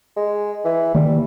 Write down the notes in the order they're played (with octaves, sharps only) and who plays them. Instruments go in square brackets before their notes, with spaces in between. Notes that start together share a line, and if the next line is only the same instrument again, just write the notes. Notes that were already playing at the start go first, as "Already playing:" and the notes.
[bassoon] G#3
E3
[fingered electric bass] D#3 A#3 [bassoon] G3